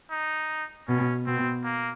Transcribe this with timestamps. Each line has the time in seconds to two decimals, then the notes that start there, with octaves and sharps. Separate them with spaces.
0.11 D#4
0.88 B2 C#4
1.26 B2 C4
1.65 A#3